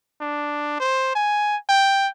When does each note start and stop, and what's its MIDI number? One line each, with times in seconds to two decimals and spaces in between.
0.21 0.76 62
0.80 1.13 72
1.15 1.56 80
1.69 2.08 79